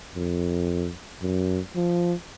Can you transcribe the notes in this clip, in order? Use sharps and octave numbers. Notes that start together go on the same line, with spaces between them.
F2
F#2
F3